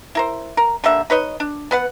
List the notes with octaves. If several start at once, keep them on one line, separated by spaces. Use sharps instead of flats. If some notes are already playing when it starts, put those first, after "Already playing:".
E4 A#4 C5
A#4
D3 G3 A#3 E5
D#4 B4 C#5 D#5
D4
B3 B4 F#5